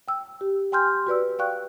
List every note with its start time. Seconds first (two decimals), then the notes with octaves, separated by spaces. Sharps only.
0.08 G5 E6
0.41 G4
0.72 G5 G#5 C6 F6 G6
1.07 F#4 B4 D5 E6
1.39 D5 F5 G5 C#6 F#6